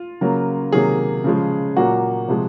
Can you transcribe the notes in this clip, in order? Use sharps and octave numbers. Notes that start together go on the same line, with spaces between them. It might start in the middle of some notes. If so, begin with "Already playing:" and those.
Already playing: F4
C#3 F#3 A#3
C3 D#3 F#3 A#3 G#4
C#3 F3 G#3
A#2 F#3 A#3 F#4
C3 F3 G#3